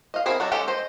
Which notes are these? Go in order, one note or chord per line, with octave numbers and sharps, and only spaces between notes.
D#5 F5
B3 C4 E4 G#4 A#4
F#3 D4 D#4
G#3 C#4 G4 A4
C5 D#5